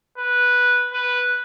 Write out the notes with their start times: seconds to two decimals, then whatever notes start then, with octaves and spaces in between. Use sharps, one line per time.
0.18 B4
0.93 B4